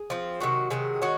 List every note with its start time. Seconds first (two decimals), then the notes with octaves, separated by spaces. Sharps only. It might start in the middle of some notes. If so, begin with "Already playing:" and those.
Already playing: G#4
0.10 F3 C4
0.40 C3 D#3 F#3 F#4
0.70 C3 D#3 F#3 G#4
1.02 D#3 G#3 C#4 F#4